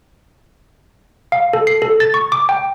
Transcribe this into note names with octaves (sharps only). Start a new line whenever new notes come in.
F5
A4
C7
A4
A6
C#6
D6
G5